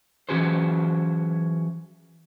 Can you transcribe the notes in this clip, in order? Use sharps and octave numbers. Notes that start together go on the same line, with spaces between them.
E3 F#3 C#4 F#4 G#4 C5